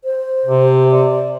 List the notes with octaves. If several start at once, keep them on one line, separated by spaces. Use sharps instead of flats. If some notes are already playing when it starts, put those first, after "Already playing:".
C5
C3
D5